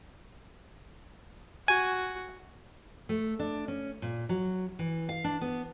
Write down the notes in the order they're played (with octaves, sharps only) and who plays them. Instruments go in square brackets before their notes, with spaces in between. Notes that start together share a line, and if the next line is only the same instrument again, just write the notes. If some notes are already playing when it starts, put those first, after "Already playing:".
[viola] F#4 [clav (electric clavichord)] G#5
[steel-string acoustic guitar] A3
D4
C#4
A#2
F#3
E3
F5
D4
B3